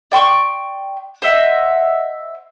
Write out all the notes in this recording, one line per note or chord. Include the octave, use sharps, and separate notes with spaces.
D5 G5 C6 C#6
C5 D#5 E5 F#5